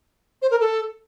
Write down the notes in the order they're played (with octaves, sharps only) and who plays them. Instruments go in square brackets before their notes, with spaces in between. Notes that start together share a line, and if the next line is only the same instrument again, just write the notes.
[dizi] C5
A#4
A4